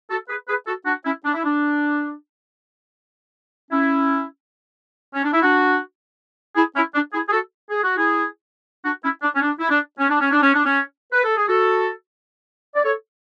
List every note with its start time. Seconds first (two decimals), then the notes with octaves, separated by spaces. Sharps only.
0.10 F#4 A4
0.29 G#4 B4
0.48 G#4 B4
0.67 F#4 A4
0.86 D4 F#4
1.05 C#4 E4
1.24 D4
1.34 E4
1.44 D4
3.71 C#4 E4
5.15 C#4
5.24 D4
5.34 E4
5.43 D4 F#4
6.56 E4 G#4
6.75 C#4 E4
6.95 D4
7.13 E4 G#4
7.28 G#4
7.32 F#4 A4
7.70 G#4
7.84 F#4
7.97 E4 G#4
8.84 D4 F#4
9.04 C#4 E4
9.23 D4
9.35 C#4
9.42 D4
9.60 E4
9.70 D4
9.98 C#4
10.10 D4
10.20 C#4
10.32 D4
10.42 C#4
10.54 D4
10.65 C#4
11.13 B4
11.24 A4
11.36 G#4
11.48 F#4 A4
12.76 D5
12.83 A4 C#5